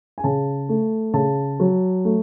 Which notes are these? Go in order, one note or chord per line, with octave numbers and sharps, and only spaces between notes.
G#5
C#3 A5
A3
C#3 A5
F#3
A3